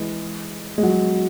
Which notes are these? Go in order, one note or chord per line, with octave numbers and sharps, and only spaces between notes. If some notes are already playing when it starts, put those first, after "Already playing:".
Already playing: E3 G#3
G#3
F#3